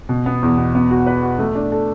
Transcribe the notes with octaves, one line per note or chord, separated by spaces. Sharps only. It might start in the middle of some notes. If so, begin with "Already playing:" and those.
B2
B3
E2
B2
B3
F#4
B4
F#4
A3
D4
A4